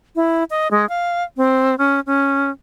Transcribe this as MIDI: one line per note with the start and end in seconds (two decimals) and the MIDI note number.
0.16 0.44 64
0.50 0.68 75
0.71 0.88 56
0.89 1.24 77
1.37 1.75 60
1.78 2.00 61
2.06 2.50 61